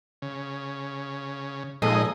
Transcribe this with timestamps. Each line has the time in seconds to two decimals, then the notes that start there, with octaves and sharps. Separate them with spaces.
0.22 C#3
1.82 A#2 F3 G#3 D#4 G#4 A4 D#5